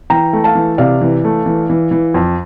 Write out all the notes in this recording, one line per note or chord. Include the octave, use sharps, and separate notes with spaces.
E3 G5 A#5
A3
F5 A5
E3
C3 D5 F5
E3
A3
E3
E3
E3
F2